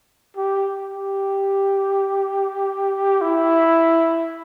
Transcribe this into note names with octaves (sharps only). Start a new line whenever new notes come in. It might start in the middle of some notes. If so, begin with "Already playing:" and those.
G4
G4
E4